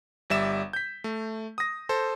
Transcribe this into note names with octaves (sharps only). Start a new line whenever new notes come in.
G1 G3 D5 E5 E7
G6 B6
A3
D#6 A#6
A4 C5